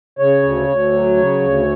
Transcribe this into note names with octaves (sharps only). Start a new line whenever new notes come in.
C#3 C#5
D2
D2
F#3
C#3
D2